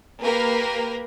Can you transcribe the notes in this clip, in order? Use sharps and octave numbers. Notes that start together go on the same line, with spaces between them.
A#3 G4 A#4 B4